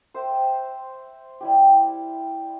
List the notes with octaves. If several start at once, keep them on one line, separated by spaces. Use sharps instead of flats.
C5 E5 G5
G3 E4 G4